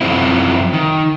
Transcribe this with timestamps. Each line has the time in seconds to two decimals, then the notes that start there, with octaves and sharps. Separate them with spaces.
0.01 F#2 C3 F3 C4 E4
0.73 D#3